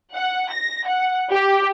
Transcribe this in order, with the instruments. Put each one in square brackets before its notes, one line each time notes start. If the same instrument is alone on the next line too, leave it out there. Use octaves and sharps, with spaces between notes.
[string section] F#5
A#6
F#5
G4